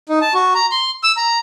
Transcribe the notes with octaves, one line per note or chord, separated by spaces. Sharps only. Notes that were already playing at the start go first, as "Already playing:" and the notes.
D#4
A5
F#4
A#5
C6
E6
A#5